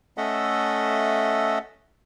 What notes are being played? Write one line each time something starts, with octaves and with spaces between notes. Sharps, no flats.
A3 C#4 A4 D#5 E5 F#5